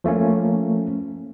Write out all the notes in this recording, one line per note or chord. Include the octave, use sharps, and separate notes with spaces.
F3 A3 A#3 C#4